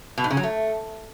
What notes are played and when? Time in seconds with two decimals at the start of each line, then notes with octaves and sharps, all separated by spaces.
0.18 B2
0.24 G#2
0.30 C#3
0.37 F#3
0.43 A3